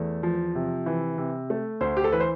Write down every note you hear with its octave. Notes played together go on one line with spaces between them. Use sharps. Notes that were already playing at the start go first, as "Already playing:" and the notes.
Already playing: E2 A3
F3
C3
E3
C3
A3
D2 C5
G4
A4
E3 B4
C5